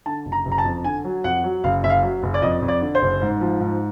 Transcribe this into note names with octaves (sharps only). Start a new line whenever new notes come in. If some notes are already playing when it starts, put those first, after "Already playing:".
D3 A5
F#1
A#5
F#1
A#5
A5
F2
D3 G#5
F#3
F2 F#5
F#3
F#1 F5
F#1 E5
F5
F#3
F#1
D5
F2 D#5
F2
D5
D3
C5
F#1
G#2
F3
G#2